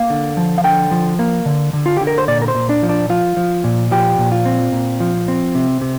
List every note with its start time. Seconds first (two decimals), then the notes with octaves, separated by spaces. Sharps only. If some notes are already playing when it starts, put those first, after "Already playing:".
Already playing: A#3 F5
0.10 D3
0.37 F3
0.58 F5
0.64 D3 G5
0.91 F3
1.19 A#3
1.46 D3
1.73 D3
1.86 F4
1.97 D3 G4
2.07 A#4
2.18 C5
2.28 A#2 D5
2.42 A#4
2.48 C5
2.55 A#2
2.69 D4
2.83 F3
2.89 D4
3.10 F3 F4
3.37 F3
3.64 A#2
3.91 F3 G4
4.18 A#2
4.32 F4
4.45 C4
4.73 A#2
5.00 F3
5.28 C4
5.55 C3
5.82 C3